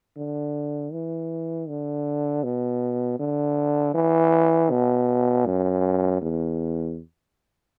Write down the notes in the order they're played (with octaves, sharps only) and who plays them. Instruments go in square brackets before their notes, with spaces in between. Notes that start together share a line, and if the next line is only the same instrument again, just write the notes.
[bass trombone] D3
E3
D3
B2
D3
E3
B2
F#2
E2